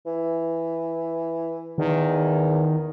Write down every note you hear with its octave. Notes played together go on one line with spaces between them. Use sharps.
E3
E2 D#3